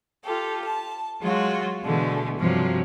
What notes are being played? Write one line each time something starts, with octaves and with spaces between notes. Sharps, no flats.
F4 G4 A4
A5
F#3 G#3 F4 F#4
B2 D3 E3 G#3 A3
G2 C3 F3 F#3